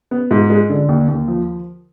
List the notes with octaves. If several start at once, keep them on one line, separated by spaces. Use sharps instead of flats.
B3
G#2
G#3
D3
D#2
D#2
F3